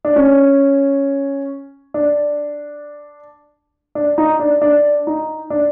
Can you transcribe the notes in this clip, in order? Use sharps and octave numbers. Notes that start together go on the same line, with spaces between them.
D4
C#4
D4
D4
D#4
D4
D4
D#4
D4